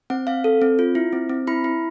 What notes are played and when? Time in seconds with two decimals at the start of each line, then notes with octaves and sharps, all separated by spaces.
0.10 C4 F#5
0.27 C4 F5
0.44 A4
0.62 C4
0.79 F4
0.95 E4
1.13 C4
1.29 C4
1.47 E4 B5
1.64 E4